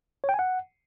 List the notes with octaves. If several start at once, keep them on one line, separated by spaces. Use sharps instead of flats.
C#5
G5
G#5
F#5